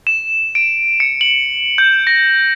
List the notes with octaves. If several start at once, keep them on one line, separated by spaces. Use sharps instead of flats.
E7
D7
C#7
F#7
G6
A#6